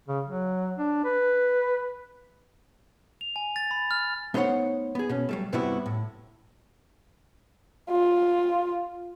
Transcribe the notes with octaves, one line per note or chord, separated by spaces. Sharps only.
C#3
F#3
D4
B4
F7
G#5
A6
B5
F6
A3 B3 D#4 C5 C#5 F#5
B3 G#4
B2 C#4
F#3 G3 A3
G2 C3 G3 B3 E4 F#4
A2
F4